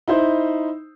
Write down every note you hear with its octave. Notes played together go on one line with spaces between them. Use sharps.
D#4 E4 C5